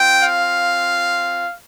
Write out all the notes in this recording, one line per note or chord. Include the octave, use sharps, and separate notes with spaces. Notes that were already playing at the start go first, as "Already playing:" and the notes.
Already playing: C4 F4 G5
F5